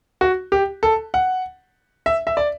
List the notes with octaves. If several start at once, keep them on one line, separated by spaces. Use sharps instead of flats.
F#4
G4
A4
F#5
E5
E5
D5